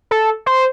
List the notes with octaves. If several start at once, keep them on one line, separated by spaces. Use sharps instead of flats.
A4
C5